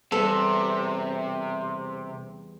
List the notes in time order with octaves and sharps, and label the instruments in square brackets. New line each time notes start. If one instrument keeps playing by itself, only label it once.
[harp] E2 G3 B4 [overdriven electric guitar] C3 [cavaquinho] A4